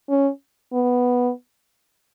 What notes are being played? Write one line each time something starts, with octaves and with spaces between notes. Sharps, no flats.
C#4
B3